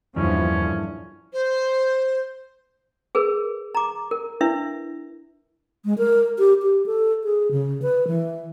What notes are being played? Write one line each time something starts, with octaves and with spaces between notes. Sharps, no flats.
A#1 E2 G2 D3 F3 C#4 D4 E4
C5
G#4 A#4 B4
A#5 D6
A#4
D4 E4 B4 E5
G#3
A#4
G4
G4
A4
G#4
C#3
B4
E3